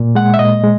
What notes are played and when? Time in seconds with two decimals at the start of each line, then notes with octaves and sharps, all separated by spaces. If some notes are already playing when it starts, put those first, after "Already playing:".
Already playing: A#2
0.15 G#3 F#5
0.34 E5
0.39 A#2 D#5
0.63 G#3